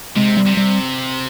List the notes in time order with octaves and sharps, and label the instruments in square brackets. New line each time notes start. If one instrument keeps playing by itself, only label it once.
[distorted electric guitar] C3 [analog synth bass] G#3
[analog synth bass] G3
[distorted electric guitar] C3
[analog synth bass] G3